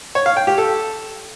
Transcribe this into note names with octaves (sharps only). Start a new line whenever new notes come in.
C#5
F5
G5
G4
A4